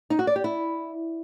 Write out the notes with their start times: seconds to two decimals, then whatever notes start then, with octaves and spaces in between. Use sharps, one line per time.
0.10 D#4
0.19 F#4
0.27 D5
0.36 G4
0.44 E4